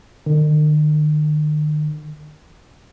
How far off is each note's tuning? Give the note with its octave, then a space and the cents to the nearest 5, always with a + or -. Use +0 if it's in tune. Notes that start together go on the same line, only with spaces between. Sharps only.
D#3 -45